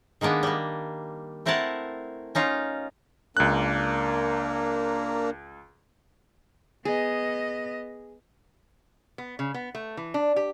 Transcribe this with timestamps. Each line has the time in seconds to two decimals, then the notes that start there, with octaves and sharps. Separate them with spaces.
0.21 D#3 G#3 A#3 B3 D4
0.43 G3 A#3
1.46 A3 C4 E4 A#4 F#5 A5
2.35 C#4 D#4 F4 F5
3.37 C#2 A#3 D4 A#4 F#6
6.85 B3 G#4 D#5
9.18 B3
9.39 C#3
9.54 B3
9.75 A3
9.97 E3
10.14 D4
10.36 G4